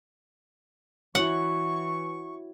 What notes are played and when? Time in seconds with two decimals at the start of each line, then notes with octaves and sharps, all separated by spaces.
1.15 E3 E4 F#4 C#5 F#5 C#6